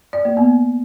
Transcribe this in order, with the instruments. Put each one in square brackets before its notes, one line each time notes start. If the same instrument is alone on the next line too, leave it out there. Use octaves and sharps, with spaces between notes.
[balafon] D5
A#3
B3